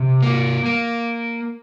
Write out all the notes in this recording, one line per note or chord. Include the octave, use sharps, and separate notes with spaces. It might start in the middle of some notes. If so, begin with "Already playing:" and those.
Already playing: C3
A#3
A#3